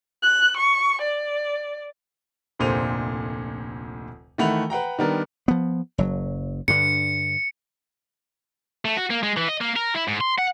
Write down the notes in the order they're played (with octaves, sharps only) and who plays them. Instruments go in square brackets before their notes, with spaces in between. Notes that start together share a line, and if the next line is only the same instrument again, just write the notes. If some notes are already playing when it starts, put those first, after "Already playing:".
[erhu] F#6
C#6
D5
[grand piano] F1 D2 A#2 C5 D#7 F7
D#3 E3 A3 F#5 B5 F7
B4 F#5 G5 A#5
D#3 G3 B3 D4 A#4
[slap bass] F3 B3
F#1 F#3
[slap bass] G2 D3 [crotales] C#7
[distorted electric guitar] A3
F#4
A#3
G#3
E3
D#5
A#3
A#4
E4
G#2
C6
F#5